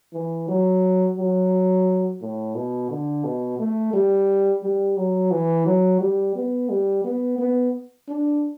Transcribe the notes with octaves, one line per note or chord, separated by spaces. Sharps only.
E3
F#3
F#3
A2
B2
D3
B2
A3
G3
G3
F#3
E3
F#3
G3
B3
G3
B3
B3
D4